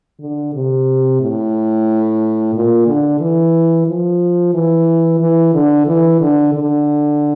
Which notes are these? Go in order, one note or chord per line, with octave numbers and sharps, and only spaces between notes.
D3
C3
A2
A#2
D3
E3
F3
E3
E3
D3
E3
D3
D3